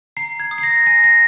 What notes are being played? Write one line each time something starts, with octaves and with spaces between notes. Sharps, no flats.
A#5 C7
G#6
D#6
C7
A#6
G#5 A#6
A#6